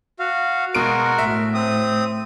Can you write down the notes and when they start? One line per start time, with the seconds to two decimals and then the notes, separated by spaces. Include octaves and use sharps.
0.19 F#4 F5
0.75 B2 G#3 F#4 A#4 D7
1.18 A2 E5
1.54 C4 D#6